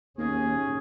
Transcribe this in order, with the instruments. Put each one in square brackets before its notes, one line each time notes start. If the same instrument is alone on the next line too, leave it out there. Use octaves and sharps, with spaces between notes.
[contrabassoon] D#2 [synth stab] A#3 [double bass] C#4 [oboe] G#4